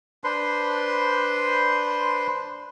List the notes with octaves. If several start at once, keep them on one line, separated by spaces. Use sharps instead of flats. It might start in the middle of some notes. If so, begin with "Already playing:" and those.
D4 B4 C5 C6